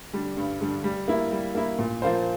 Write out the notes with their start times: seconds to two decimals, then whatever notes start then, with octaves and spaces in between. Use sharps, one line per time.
0.13 D3 G3 D4
0.37 G2
0.61 D3 G3 D4
0.84 G3
1.08 A#3 E4
1.32 G3
1.55 A#3 E4
1.79 A#2
2.02 F3 A#3 F4 C5